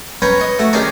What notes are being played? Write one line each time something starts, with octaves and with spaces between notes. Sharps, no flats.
C#4 B4 C#5 G5 A#5
D#5 C#6
A3 F#4
D#3 C#4 G4 G#4 D5 A#5